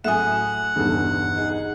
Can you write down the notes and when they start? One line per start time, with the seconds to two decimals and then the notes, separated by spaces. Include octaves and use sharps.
0.04 A2 F#3 E5 F#5 G#5 D#6
0.76 B1 E2 G2 D3 A4
1.35 D#4 G#4